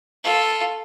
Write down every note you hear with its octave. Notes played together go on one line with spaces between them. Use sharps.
F4 A4